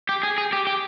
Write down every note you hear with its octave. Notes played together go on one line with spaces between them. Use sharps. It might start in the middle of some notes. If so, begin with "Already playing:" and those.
G4
G#4
G#4
G4
G4